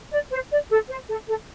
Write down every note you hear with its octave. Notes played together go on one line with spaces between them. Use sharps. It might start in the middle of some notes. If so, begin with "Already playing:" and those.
D5
C5
D5
A4
C5
A4
A4